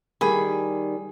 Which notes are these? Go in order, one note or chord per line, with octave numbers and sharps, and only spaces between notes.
D#3 G3 G#4 B5